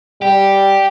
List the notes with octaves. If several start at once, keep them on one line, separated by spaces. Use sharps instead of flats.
G3 G4